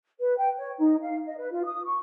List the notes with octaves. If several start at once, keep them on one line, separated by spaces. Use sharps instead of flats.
B4
G5
C#5
D#4
F5
D#5
B4
F4
D#6
C#6